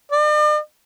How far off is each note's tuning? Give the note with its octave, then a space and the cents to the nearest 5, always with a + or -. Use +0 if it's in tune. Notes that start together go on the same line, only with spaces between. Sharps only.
D5 +45